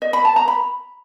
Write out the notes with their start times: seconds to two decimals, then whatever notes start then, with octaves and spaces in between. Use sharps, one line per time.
0.02 D#5
0.13 B5
0.25 A5
0.36 A#5
0.48 B5